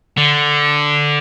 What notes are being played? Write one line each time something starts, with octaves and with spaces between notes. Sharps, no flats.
D3